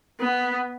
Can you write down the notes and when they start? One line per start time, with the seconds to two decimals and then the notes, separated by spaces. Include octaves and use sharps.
0.20 B3